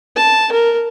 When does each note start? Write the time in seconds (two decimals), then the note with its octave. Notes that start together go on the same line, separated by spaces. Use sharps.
0.16 A5
0.52 A#4